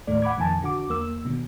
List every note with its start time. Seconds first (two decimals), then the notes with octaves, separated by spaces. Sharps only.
0.07 D#2 A2 D#3 A3 D5
0.22 F#5 B5 D6 G#6
0.37 F2 A#2 D#3 G#5 A5
0.62 D3 F#4 D6
0.89 E2 A#3 E6
1.25 B2 D3 D#3